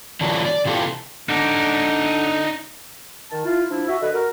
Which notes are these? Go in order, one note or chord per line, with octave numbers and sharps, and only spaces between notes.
D3 E3 F#3 D4 F4
D5
C3 E3 F4 G4 A4
D3 D#4 D5
D#3 A5
E4 F4
F3 D4 E4
F#4 E5
D3 A4 B4 D#5
F#4 A#4